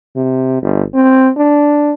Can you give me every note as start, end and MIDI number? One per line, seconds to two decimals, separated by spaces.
0.16 0.62 48
0.62 0.83 31
0.94 1.29 60
1.37 1.93 62